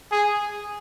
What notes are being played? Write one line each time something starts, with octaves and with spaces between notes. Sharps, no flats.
G#4